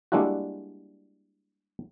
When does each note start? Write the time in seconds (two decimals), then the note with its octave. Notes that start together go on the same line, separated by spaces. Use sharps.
0.12 G3 G#3 A#3 D4 E4 F#4